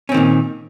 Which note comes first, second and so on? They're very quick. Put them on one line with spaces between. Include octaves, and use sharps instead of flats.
C#4 C4 D#3 A#2